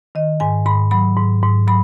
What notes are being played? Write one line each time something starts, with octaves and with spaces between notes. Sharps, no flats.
D#3 D#5
G#2 G#5
G#2 B5
F#3 B5
G#2
G#2
F#3 B5